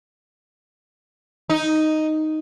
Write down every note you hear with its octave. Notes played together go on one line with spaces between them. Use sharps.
D#4